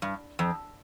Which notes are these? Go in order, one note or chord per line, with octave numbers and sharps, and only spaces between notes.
G2
F2